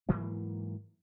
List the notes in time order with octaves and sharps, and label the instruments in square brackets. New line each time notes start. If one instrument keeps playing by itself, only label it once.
[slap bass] G#2 E3 F#3 A#3